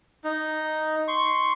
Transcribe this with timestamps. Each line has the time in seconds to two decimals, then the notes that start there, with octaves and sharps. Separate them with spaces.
0.24 D#4
1.08 C6 C#6